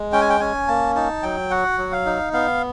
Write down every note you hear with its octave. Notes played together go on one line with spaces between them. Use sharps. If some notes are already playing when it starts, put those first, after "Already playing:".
Already playing: G#3
C#4 G5
G#5
G5
C#4 G#5
A#3 A5
D#4 A5
F#3 G5
F#4 F#5
F#3
F5
D#4
B3 F5